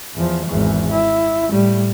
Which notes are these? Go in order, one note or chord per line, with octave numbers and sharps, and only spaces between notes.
E2 F3
G#1 E2
E4
A2 G3